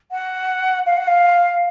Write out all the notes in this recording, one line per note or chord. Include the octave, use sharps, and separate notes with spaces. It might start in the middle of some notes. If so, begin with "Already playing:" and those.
F#5
F5
F#5
F5